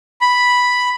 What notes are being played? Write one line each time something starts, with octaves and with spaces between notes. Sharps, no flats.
B5